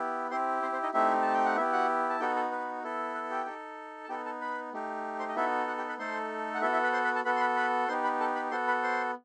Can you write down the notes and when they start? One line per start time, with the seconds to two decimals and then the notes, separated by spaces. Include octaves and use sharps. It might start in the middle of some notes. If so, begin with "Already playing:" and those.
Already playing: B3 E4 G4
0.30 C4 E4 G4 C5 C6
0.62 C4 C5
0.72 C4 C5
0.83 D#4 D#5
0.94 A3 C4 D#4 E4 G4 E5
1.22 A5
1.34 G5
1.45 F#5
1.56 B3 E4 G4 E5
1.72 F#4 F#5
2.10 A5
2.20 B3 D#4 F#4 G4 A4 G5
2.36 A4
2.51 B4
2.83 B3 E4 A4
3.15 B4
3.30 G4 G5
3.46 D#4 A4
4.04 A5
4.09 B3 D#4 G4 A4 G5
4.25 A4 A5
4.41 B4 B5
4.73 A3 D#4 G4
5.19 C5 C6
5.29 D#5
5.36 B3 D#4 E4 F#4 A4 E5
5.68 F#4 F#5
5.77 G4 G5
5.89 B4 B5
5.99 A3 D#4 A4 C5 C6
6.54 F#5
6.62 B3 E4 F#4 A4 E5
6.72 E4 E5
6.83 B4 B5
6.93 C5 C6
7.04 B4 B5
7.15 A4 A5
7.25 B3 F#4 A4 B4 B5
7.36 C6
7.40 B4 B5
7.57 B4 B5
7.88 B3 D#4 G4 C5 C6
8.04 B4 B5
8.20 A4 A5
8.36 B4 B5
8.51 B3 F#4 A4 C5 C6
8.67 B4 B5
8.83 C5 C6